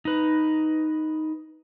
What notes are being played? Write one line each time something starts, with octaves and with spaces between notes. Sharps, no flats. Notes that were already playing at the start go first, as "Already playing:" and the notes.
D#4 B4